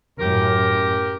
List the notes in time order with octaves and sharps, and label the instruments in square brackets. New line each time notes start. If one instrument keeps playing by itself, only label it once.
[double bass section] F#2 A2 [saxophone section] G4 A#4